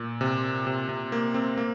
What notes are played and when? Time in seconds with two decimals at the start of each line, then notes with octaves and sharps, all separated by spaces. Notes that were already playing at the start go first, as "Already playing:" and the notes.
Already playing: A#2
0.21 C3
0.67 C3
0.89 C3
1.12 A#3
1.34 C4
1.58 A#3